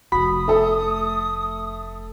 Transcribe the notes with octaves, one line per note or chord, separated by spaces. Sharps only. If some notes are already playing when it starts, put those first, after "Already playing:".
F1 F2 F#4 B5 D#6
A3 A4